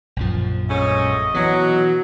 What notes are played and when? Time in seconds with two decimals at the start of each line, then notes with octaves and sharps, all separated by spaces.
0.16 A#1 F#2 F3
0.68 G#2 A3 C#4 D#5
1.34 B2 E3 F#3